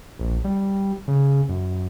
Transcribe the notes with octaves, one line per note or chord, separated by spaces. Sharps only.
A#1
G3
C#3
F#2